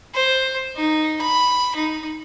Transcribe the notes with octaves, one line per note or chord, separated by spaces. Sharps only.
C5
D#4
B5
D#4